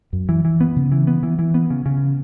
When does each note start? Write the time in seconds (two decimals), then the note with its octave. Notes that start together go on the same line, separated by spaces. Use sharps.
0.13 F#2
0.29 E3
0.45 E3
0.61 B3
0.76 C#3
0.92 E3
1.07 B3
1.23 E3
1.39 E3
1.54 B3
1.70 C#3
1.86 C#3